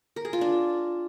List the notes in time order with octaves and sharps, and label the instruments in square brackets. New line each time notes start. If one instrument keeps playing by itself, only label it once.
[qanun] A#4
G#4
F4
D4